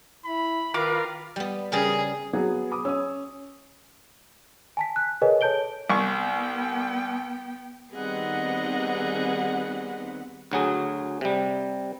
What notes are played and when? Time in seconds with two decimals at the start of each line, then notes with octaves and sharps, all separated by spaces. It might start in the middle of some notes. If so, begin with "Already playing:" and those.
0.25 E4 B5
0.74 D#3 F4 A#4 B4 F5 D6
1.36 G3 B3
1.72 C#3 G3 G#4 A#4
2.33 F#3 B3 G#4
2.72 B5 D6 D#6
2.85 C#4 D#6 E6
4.77 G#5 A5 B6
4.96 F#6
5.22 G#4 A#4 B4 C#5 D#5 G#5
5.41 A4 C#5 A5 G6 D7 G7
5.90 C2 B3 G5 C#6
7.92 D#3 G3 B3 C4 G#4 D#5 F#5
10.51 D2 F#3 G#4
11.21 C3 G3